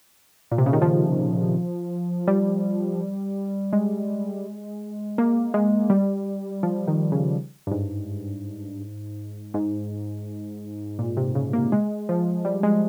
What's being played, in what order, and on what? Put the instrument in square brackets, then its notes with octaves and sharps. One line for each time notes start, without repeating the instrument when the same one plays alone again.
[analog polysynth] A#2
C3
C#3
D#3
F3
G3
G#3
A#3
G#3
G3
F3
D#3
C#3
G2
G#2
G#2
A#2
C3
C#3
A#3
G#3
F3
G3
G#3